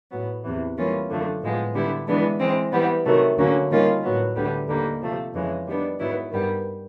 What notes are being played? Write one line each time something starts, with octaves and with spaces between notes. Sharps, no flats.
A2 F#3 B3
E2 C3 E3
E3 G3 A#3 C#4 F4
F#2 D3 F3 A3
A2 F3 G#3 B3
D3 G3 B3 E4
E3 G#3 B3 D4
E3 G#3 C4
E3 G3 B3
C3 D#3 F#3 A3
D2 D3 F#3 A#3 C#4
D#3 G3 A#3 C#4 F4
A2 F#3 B3
D2 D3 G3 B3
D#2 D3 G3 A#3
C3 F3 A3
F2 C#3 E3 G#3
D#3 G3 B3 D4
G#2 D#3 F#3 B3 E4
G2 D#3 G3 B3